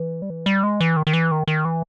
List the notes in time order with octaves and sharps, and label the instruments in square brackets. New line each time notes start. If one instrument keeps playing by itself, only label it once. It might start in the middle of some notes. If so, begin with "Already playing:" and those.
Already playing: [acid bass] E3
G3
E3
G3
G#3
E3
D#3
D#3
E3
D#3
D#3
E3